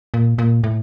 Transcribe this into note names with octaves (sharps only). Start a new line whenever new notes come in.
A#2
A#2
A2